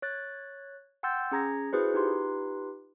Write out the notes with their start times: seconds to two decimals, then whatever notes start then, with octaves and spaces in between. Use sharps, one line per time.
0.02 C#5 F#6 A6
1.03 F#5 G5 C6 E6 G6 A6
1.31 C#4 G#4 A#5 G#6 A#6
1.73 E4 F#4 G#4 B4 C5
1.94 D#4 F4 G4 B4 C6